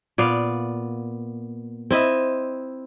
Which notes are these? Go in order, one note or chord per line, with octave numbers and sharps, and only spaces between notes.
A#2 B3 D5 F5
C4 E4 D#5 E5